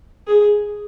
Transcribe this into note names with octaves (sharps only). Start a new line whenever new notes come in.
G#4